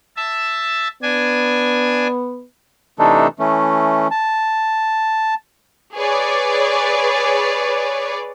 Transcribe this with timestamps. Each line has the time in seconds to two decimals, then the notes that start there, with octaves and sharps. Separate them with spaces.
0.17 E5 A5
1.02 B3 D4 G#5
2.99 C3 E3 A3 D4 D#4 A4
3.39 E3 A3 C#4
4.11 A5
5.95 G#4 B4 C#5 D5